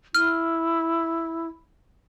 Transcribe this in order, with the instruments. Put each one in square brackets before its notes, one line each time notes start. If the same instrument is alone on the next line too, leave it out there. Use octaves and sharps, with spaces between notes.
[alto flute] E4 [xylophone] F6